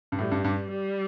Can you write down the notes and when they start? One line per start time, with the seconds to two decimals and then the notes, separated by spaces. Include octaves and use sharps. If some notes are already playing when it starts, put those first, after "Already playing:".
0.12 G2
0.19 A2 G3
0.31 G2
0.44 G2
0.71 G3